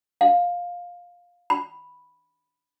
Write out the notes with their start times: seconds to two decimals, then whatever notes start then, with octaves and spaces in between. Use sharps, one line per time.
0.21 F5
1.50 B5